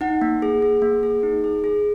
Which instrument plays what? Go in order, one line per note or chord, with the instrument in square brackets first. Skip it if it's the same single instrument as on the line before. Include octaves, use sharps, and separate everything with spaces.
[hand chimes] D#4 F#5
A#3
G#4
G#4
A#3
G#4
D#4
G#4
G#4